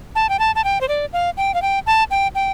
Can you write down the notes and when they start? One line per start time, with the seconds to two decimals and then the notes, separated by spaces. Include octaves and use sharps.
0.15 A5
0.29 G5
0.39 A5
0.55 A5
0.64 G5
0.81 C5
0.89 D5
1.13 F5
1.37 G5
1.54 F5
1.62 G5
1.87 A5
2.11 G5
2.35 G5